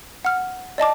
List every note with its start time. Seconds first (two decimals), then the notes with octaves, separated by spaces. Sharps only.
0.25 F#5 F6
0.78 D5 D#5 A5 D6